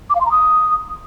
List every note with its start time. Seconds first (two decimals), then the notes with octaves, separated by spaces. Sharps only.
0.10 D6
0.15 F5
0.21 C6
0.26 A#5
0.31 D#6